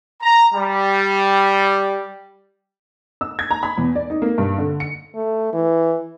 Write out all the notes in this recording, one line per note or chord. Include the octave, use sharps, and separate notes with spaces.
A#5
G3
E6
G#6
A#5
B5
E2
D5
D#4
A#3
G2
D3
C#7
A3
E3